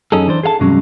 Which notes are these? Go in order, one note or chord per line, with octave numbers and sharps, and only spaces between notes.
F#2 C#4 D#4 G#4 A4
E3 D4 C5
G#4 A4 F5 A5
E2 G2 C3 F#3 G#3 C#4